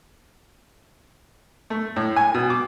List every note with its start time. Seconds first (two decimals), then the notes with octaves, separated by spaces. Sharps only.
1.70 A3
1.96 A2
2.16 G#5
2.34 B2
2.50 D6